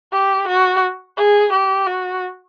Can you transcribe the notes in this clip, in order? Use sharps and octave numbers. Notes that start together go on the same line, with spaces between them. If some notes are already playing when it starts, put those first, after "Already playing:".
G4
F#4
G#4
G4
F#4